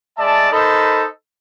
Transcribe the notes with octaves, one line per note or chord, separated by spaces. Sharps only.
G#3 D5 E5 A5
D#4 A4 A#4 C5 D#5 B5